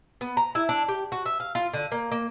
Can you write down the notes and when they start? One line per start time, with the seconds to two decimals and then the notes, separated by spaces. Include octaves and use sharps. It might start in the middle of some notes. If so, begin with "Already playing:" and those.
0.21 B3
0.37 A#5
0.55 E4
0.69 D4
0.88 G4
1.12 F#4
1.26 E5
1.40 F5
1.55 F4
1.74 D3
1.92 A#3
2.12 A#3